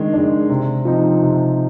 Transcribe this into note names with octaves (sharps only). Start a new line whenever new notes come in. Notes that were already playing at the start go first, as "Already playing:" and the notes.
Already playing: D#3 G#3 D4
G#3 D4
C3
F3 C4 D#4
C3